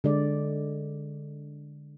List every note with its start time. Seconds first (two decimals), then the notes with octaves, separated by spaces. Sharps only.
0.04 D3 G#3 D5